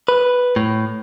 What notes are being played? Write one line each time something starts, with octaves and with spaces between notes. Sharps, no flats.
B4
A2